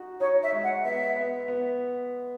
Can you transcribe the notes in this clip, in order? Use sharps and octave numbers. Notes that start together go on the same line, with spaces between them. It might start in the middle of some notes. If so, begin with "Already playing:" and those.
Already playing: D#4 F#4
D#4 C#5
E5
G#3
F#5
B3 E5
B3
B3